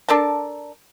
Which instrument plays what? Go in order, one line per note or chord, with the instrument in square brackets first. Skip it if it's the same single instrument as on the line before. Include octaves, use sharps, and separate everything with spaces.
[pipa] D4 A4 A#4 A5